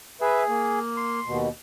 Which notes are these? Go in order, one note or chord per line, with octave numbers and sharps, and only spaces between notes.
G#4 B4 E5
A#3
C6
D#2 B2